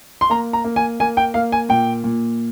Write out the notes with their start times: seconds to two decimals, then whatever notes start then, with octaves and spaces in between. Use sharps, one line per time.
0.21 C6
0.30 A#3 A#5
0.53 A#5
0.65 A#3
0.76 G#5
1.00 A#3 G#5
1.17 G5
1.34 A#3 F5
1.52 G#5
1.69 A#2 G5
2.04 A#2